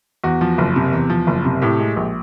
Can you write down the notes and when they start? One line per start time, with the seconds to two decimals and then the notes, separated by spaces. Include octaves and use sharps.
0.24 E2 F#4
0.41 F3
0.58 F#1
0.76 C3
0.93 E2
1.10 F3
1.27 F#1
1.45 C3
1.62 A2 G4
1.79 G#3
1.97 A#1